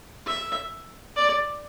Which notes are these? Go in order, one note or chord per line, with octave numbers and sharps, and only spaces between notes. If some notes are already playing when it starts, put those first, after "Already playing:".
E5
D5